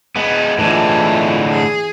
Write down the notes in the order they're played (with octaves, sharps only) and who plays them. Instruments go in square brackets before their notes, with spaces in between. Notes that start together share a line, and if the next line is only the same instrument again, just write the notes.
[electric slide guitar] G#3 B3
[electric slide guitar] A2 D3 G#3 [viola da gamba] E3 F4
[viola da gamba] G#4